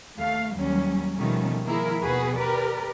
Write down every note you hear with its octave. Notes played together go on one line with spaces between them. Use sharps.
D#2 A3 F5
D#2 F#3 G3 C#4
B2 D#3 F3 G3 A3 C#4
D#3 F3 A#3 E4 G#4 A#4
D#2 B2 F3 F#4 G#4 B4
G4 A#4 B4 D5